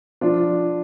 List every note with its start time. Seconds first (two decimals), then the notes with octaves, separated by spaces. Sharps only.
0.21 F3 D4 F4